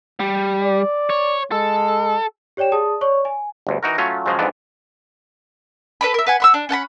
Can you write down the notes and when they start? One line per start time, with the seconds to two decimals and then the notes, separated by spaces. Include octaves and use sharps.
0.20 G3
0.62 D5
1.10 C#5
1.52 G#3 A4
2.57 G4 C#5 D5 G5 E7
2.72 G#4 D5 A5 D#6
3.01 C#5 D5 C#6
3.25 G#5
3.67 G1 D2
3.83 E3 D#4 F#4 A#4
3.98 F#3 A3 C#4 F4 C#5
4.26 C#3 F3 F#3 G#3
4.39 F2 G#2 E3 B3 D4
6.01 A4 B4 D5 B5
6.14 A#4 E5
6.27 B4 F#5 G#5
6.40 F#5 B5 E6
6.54 D4
6.69 C#4 F#5 A5 B5